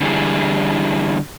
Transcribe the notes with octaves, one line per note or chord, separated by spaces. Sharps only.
D3 E3 G3 E4 G#4